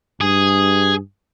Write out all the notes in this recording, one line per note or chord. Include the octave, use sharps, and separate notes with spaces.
G2 G#4